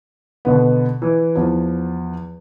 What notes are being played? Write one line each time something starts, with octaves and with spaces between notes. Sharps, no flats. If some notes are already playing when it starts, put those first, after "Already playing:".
B2 D3 B3
E3
E2 F3